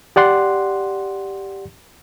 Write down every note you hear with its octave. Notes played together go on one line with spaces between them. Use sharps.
G4 D5 F#5 C6